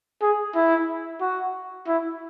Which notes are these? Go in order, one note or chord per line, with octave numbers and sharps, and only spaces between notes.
G#4
E4
F#4
E4